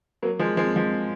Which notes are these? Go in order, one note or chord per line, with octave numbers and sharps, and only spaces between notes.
F#3 A#3
F3 G#3
F3 G#3
F3 G#3